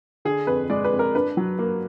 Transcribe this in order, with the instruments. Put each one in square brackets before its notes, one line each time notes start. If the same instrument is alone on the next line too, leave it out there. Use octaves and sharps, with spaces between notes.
[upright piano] D3 G#4
F2 B4
G#3 D5
B4
F2
A#4
D4 B4
F#3
A#3